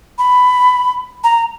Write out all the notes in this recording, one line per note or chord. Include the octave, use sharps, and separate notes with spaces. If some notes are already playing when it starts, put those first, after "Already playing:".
B5
A#5